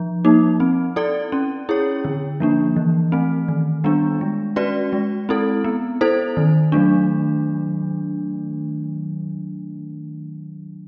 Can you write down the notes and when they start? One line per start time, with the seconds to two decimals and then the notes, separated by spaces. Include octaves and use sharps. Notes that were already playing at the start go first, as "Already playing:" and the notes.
Already playing: F3
0.25 A#3 D#4
0.60 C4
0.96 E4 A4 D5
1.32 C#4
1.69 E4 G#4 C#5
2.05 D3
2.40 F3 A#3 D4
2.76 E3
3.12 A3 C4
3.48 D#3
3.84 G3 B3 D4
4.21 G#3
4.56 C#4 F#4 B4 D5
4.93 G#3
5.29 C4 E4 A4
5.64 B3
6.01 E4 A4 C5
6.37 D#3
6.72 F#3 A3 D4